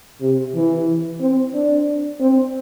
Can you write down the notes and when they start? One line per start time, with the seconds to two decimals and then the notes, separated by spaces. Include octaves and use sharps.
0.21 C3
0.55 E3
1.20 C4
1.54 D4
2.20 C4